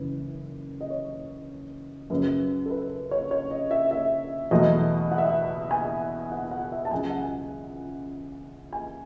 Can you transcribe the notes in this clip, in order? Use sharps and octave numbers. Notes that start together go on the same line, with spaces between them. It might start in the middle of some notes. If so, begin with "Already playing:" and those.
Already playing: F#1 F#2 E3 B4
D#5
C#5
F#2 C#3 F#3 B4
A4
B4
C#5
C#5
D#5
E5
E5
E2 B2 F#3 A3 D#5
F#5
E5
F#5
G#5
F#5
F#5
E5
A5
C#2 C#3 F#3 G#5
F#5
G#5
G#5